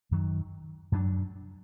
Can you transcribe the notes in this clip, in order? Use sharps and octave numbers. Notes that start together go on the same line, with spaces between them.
F#2 D#3 F#3
F#2 F#3 A#3 D4